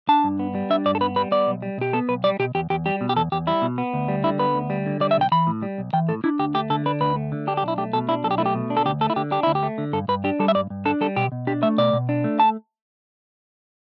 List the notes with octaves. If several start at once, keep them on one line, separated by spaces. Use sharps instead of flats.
D4 A5
G2
B3
G3
D4 E5
G2 D5
A4
B3 B4
G3 B4
B3 D5
B1
G3
B2 G4
B3 A4
B1 B4
G3 D5
B2 G4
E2 G4
E2 G4
G3 G4
B2
G4
E2 A4
E2 G4
G3 E4
B2
B3
D2
G3
D3 E4
B3 B4
D2
G3
D3
G3 D5
E5
B1 G5
E3 B5
A2
G3
B1
E3 G5
A2 A4
D4 E4
D2 G4
A3 G4
D3 A4
D4 B4
D2 B4
A3
D3
D4 G4
G4
B1
E4
A3 G4
B2 A4
D4 E4
B1 A4
G4
A3 E4
G4
B2
D4
A4
D2 G4
A3 A4
E4
D3 G4
D4 G4
D2 E4
G4
A3
D3
G2 A4
G2 B4
D4 G4
G3 A4
E5
G2 D5
G2
D4 A4
G3 A4
B2 G4
B2
D4 G4
A3 E5
B2 D5
B2
D4
A3
A5